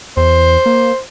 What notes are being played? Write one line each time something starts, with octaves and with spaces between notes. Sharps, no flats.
E2 C5
A#3